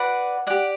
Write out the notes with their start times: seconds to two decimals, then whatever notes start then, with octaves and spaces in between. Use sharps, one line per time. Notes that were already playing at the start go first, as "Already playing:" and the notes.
Already playing: F#4 B4 D5 F#5
0.47 G4 D5 F#5